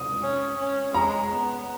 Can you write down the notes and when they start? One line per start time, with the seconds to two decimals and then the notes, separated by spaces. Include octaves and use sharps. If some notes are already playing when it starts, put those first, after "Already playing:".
Already playing: D#6
0.22 C#4
0.58 C#4
0.94 G#3 A#5
1.32 B3